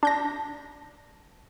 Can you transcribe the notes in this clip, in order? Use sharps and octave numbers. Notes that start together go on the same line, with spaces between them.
D4 G6 A#6